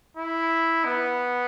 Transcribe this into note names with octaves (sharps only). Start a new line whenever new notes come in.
E4
B3